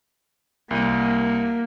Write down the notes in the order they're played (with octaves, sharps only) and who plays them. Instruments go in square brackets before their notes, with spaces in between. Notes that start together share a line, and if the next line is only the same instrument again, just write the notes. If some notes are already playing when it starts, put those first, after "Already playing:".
[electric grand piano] C2 D#7 [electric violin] A#3